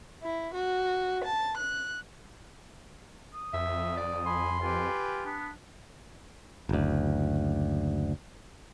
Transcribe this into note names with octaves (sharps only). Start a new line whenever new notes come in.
E4
F#4
A5
F#6
D#6
F2 E5
D5
G#5 B5 C6
F4 G4 B4 G#5
B3 D4
F#1 D2